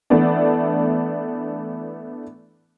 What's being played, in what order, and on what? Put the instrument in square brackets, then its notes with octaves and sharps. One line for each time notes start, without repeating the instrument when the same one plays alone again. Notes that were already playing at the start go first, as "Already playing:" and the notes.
[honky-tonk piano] E3 A3 B3 D4